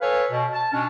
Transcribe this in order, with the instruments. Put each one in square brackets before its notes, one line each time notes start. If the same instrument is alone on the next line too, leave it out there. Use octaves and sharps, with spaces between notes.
[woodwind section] A4 B4 C#5 F5 G#5
B2
A5
B2 C#4 D4